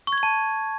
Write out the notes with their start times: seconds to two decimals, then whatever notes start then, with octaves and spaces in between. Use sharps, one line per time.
0.07 C#6
0.13 G#6
0.18 C#6
0.23 A5